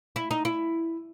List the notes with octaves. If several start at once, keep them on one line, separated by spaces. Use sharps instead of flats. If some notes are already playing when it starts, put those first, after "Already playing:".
E4
D#4
E4